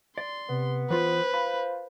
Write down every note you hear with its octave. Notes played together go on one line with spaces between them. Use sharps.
D5 C6
C3 B3
E3 F4 B4 C5
F4 B5